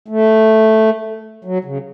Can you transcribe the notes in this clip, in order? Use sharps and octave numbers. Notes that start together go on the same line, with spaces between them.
A3
F#3
C#3